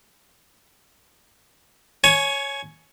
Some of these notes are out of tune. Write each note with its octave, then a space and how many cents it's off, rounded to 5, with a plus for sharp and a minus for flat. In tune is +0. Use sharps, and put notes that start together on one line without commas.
C#5 +0 G#5 +25